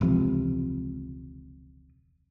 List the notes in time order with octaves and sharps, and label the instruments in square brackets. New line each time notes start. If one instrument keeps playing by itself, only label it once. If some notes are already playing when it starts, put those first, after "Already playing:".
[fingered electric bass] E1 C#2 C3 F3